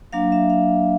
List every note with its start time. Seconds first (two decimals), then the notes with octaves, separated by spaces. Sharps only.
0.13 F#3 A#3 D4 F5
0.32 E5
0.50 F5